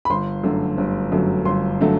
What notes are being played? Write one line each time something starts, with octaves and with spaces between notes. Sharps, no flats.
B5
G1 C6
F#2 D3 F#3 A3
G1
F#2 D3 F#3 A3
G1 C6
D3 F#3 A3